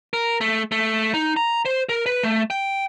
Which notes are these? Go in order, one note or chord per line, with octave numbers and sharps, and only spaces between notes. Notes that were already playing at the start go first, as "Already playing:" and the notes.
A#4
A3
A3
D#4
A#5
C5
A#4
B4
A3
G5